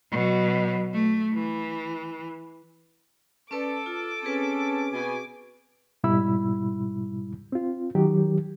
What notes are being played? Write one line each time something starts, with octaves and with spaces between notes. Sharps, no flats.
B2 F#3
A3
E3
C#4 A4 B4 D5 D6
F4
C4 C#4 G#4 B4
B2 G#5
G#2 B2 G3 E4 B5 E6
C4 F4
D#3 F#3 G4